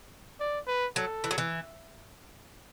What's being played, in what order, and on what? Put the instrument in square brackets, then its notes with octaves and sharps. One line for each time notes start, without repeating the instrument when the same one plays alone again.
[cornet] D5
B4
[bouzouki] F#3 [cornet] A4
[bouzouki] E3
F#3
E3